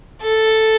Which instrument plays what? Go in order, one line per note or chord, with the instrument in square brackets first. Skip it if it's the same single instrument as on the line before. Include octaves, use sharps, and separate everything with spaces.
[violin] A4